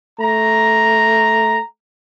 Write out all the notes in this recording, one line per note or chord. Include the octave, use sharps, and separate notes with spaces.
A3 A#5